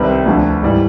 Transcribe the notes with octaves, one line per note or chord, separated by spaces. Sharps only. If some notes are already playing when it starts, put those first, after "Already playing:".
Already playing: C2 C3 D#3 G3 B4
D2 D3 F3
G#2 E3 G3